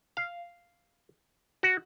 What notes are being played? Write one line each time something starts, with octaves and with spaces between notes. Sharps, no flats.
F5
F#4